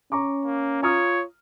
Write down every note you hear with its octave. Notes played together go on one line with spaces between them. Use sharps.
C#4 A#5 C#6 D6
A#3
F4 C#5 A#5 D#6 F6